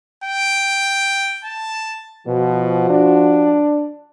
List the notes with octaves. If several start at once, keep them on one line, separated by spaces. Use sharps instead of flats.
G5
A5
B2 F3 F#4
D4